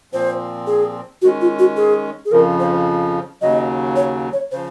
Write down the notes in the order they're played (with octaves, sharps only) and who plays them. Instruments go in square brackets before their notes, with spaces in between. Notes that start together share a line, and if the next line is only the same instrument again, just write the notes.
[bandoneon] A#2 F3 C4 [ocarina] C5
[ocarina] G#4
[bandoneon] D#3 G#3 C#4 [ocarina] F#4
[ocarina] F4
F#4
G#4
G#4
[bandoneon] F2 C#3 F3 [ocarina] A#4
[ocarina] C5
[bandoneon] D#2 C#3 F#3 [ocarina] D#5
[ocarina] C#5
C#5
[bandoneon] C#3 F3 [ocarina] C5